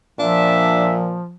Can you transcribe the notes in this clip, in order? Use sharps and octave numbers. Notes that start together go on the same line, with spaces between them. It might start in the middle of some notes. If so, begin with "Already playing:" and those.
A#2 F3 D4 E5